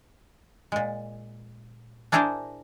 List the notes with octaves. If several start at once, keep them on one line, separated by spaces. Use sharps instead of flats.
A#2 G#3
D4 E4 G#4 A#4 C5 D5